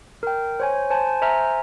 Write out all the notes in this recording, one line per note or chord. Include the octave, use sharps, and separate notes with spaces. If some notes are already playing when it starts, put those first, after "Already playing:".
A#4 G5
C5 C#5 G#5
C5 G#5 A5
C5 E5 G#5 A#5 F6